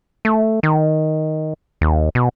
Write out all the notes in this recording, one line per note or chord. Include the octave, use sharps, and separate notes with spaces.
A3
D#3
D#2
B2